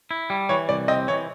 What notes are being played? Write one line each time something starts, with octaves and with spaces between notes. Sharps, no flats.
E4
G3
E3 C#5
C2 D5
C4 D#5
E3 C#5